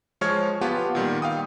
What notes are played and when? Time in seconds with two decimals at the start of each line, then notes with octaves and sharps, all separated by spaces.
0.21 F3 G#3 C#5 C#6 F6 G#6
0.61 B3 F4 G4 F#5 A5
0.95 A#2 D#3 G3
1.22 F5 G5 D#6